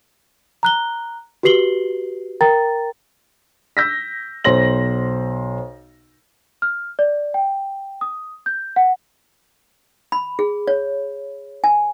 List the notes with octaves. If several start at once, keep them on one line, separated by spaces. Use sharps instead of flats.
A#5 F#6 G7
F#4 G4 B4 C7 F#7 G7
A#4 G5 A#5 A6
E6 G6 A#6 B6
B1 C5 C6 A#6 F#7
F6
D5
G5
D#6
G6
F#5
B5
G#4
C#5
G#5